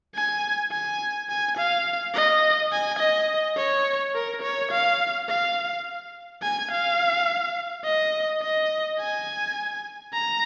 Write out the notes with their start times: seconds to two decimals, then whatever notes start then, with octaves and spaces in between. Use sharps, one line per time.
0.15 G#5
0.72 G#5
1.29 G#5
1.58 F5
2.14 D#5
2.72 G#5
2.99 D#5
3.57 C#5
4.14 A#4
4.42 C#5
4.72 F5
5.29 F5
6.42 G#5
6.71 F5
7.85 D#5
8.42 D#5
8.99 G#5
10.14 A#5